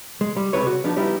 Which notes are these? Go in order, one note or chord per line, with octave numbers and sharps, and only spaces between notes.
G#3
G3
C#2 G2 C3 G3 B4 C#5
F#4
F3 B3 D4 D#4
G3 B3 D#4 E4 G4